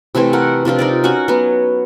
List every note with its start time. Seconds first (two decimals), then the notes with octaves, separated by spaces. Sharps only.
0.15 C3 E3 A3 C4
0.33 A3 A#4 F#5
0.65 C3 F3 D4 F4
0.79 D#4 A#4 D5
1.04 C#4 F#4 F#5 C#6
1.28 F#3 B3